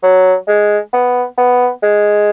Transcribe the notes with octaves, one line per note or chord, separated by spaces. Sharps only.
F#3
G#3
B3
B3
G#3